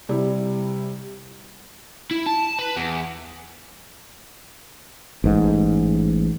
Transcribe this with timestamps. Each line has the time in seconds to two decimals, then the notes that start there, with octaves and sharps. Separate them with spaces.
0.09 C3 G3 E4
2.11 E4
2.26 A5
2.59 B4
2.77 E2
5.24 A1 G#2